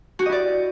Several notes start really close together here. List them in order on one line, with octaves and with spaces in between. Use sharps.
F#4 G4 D#5 E4 D5